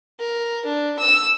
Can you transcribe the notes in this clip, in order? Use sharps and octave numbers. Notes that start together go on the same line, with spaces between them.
A#4
D4
E6